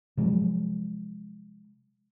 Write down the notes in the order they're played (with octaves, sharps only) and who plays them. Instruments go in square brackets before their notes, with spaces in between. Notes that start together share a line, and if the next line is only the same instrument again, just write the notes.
[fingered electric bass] C3 F3 F#3 G#3